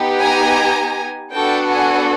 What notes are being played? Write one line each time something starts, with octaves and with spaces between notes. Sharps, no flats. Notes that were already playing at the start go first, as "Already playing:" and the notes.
Already playing: B3 D#4 G4
G#5 A#5
B3 D4 F#4 A4 G5 A5
F#5 G#5